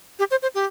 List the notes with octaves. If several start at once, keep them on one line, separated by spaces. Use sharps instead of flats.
G4
C5
C5
G4